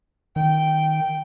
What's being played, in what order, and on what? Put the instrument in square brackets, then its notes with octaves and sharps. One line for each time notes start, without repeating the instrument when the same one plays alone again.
[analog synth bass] D#3 [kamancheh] G5